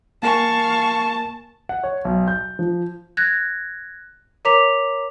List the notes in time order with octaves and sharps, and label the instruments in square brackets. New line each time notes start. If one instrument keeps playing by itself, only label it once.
[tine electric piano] A#3 A#4 G#5 [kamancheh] F5 C#6 [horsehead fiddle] A5
[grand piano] F#5
C#5
B1
G6
F3
[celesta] F#6 G#6 A#6
A#4 C#5 A#5 D6 B6 F7